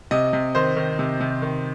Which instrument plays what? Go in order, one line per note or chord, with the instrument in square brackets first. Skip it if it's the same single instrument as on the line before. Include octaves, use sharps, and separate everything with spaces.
[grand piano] C3 D#5
C3
D#3 C5
D#3
C3
C3
D#3